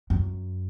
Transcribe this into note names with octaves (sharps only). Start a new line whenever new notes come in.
F#2